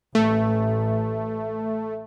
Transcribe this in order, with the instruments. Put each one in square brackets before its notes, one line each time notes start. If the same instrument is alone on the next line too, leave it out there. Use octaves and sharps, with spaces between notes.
[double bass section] A1 [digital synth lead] A3